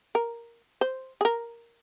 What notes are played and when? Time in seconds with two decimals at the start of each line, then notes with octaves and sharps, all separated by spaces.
0.15 A#4
0.81 C5
1.21 G#4
1.25 A#4